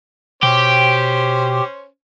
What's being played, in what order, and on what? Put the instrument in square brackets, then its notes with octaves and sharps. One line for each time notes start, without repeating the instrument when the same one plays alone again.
[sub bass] B2 [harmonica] C#4 C5 [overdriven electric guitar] G4